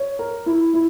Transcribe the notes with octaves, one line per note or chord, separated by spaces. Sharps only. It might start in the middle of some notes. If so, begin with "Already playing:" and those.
Already playing: C#5
A#4
E4
E4